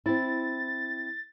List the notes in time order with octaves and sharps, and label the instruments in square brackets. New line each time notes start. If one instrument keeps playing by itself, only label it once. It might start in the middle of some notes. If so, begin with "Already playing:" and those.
[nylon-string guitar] C4 E4 [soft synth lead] A6